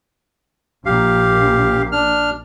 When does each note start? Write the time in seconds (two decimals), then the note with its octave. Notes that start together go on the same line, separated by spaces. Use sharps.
0.86 A#1 G4 F5
1.92 D4 F6